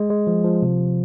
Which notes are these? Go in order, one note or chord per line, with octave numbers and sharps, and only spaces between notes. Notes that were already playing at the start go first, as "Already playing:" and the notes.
Already playing: G#3
G#3
F3
F3
C3